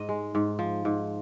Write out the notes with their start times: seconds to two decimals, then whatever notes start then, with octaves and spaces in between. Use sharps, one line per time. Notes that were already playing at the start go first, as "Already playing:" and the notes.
Already playing: G#2 D#5
0.09 G#3
0.35 G#2
0.59 F3
0.85 G#2